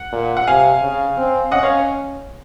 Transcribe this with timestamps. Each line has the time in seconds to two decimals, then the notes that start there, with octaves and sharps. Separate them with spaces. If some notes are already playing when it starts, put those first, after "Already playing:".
Already playing: F#5
0.12 A#2
0.37 F#5
0.47 C3 F5 G#5
0.82 C#3
1.17 C4
1.51 C#4 D#5 F#5
1.63 C#5 F5